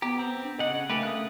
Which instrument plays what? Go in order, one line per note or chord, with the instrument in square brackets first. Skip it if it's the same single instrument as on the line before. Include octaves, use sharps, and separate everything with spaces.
[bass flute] B3 [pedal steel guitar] G4 [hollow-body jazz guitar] A#5
[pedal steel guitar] C4
[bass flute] D4
[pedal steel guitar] C#3 F#5 [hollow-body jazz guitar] D#5
[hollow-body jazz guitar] C#3 A3 A#3 [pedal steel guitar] G4 B4 [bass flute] A#4
[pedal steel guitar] D#6 F#6